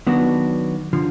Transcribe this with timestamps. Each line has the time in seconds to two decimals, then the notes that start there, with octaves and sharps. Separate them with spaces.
0.07 D#3 F#3 B3 D4 F#4
0.93 D3 F3